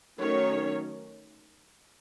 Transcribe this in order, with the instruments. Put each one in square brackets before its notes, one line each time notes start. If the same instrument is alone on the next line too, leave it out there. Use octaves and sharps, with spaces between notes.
[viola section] D#3 F#3 A3 C#4 C#5